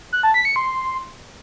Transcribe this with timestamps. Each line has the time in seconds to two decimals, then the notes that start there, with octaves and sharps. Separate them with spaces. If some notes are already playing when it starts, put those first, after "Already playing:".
0.13 F#6
0.23 A5
0.34 B6
0.45 C#7
0.56 C6